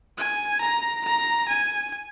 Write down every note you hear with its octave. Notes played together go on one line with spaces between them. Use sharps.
G#5
A#5
A#5
G#5